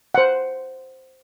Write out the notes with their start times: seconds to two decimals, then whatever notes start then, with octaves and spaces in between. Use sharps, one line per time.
0.15 C5 F#5